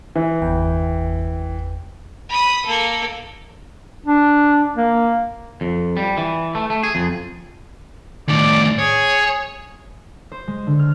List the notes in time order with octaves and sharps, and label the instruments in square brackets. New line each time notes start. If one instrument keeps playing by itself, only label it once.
[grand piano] E3
[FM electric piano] G1 E2 G5
[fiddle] B5 D#6
A#3 A4
[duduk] D4
A#3
[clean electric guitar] F2
G3
E3
A3
A3
G#4
F2
[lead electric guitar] A2 D#3 [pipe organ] D5
[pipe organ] G#4 [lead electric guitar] C#5
[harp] C5
G#3
D3
F6